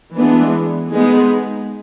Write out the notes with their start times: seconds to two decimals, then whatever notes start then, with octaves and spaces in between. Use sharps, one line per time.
0.17 E3 G#3 B3 D4
0.91 G#3 B3 D#4 G#4